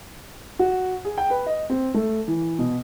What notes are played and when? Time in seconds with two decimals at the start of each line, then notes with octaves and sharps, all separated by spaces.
0.59 F#4
1.05 G#4
1.18 G5
1.30 B4
1.46 D#5
1.70 C4
1.94 A3
2.28 E3
2.59 B2